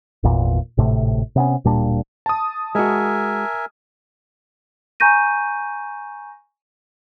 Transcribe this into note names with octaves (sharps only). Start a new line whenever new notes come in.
G#1 E2 A#2
G#1 A2 C3 A3
C3 B3 C#4
D1 A#2 G3 D4
A5 D#6
G#3 F#4 A#4 E5 G#5
G#5 A#5 C#6 G6 A#6 D#7